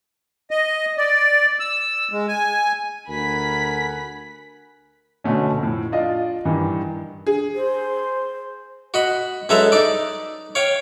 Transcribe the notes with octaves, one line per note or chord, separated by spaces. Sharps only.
D#5
D5
E6
G#3
G#5
D2 A#4 F#5 G#5 B5 B6
B2 D3 A3 C#4
F2 A2
D4 F4 D5 D#5
G2 D#3 E3
G#4
C5
F#4 D#5 B5
F#2 G#3 A4 B4 E5 A#5
D#4 D5
C#5 F5 G5